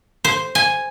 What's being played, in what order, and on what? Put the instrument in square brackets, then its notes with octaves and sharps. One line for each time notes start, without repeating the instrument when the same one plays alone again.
[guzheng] C5
G#5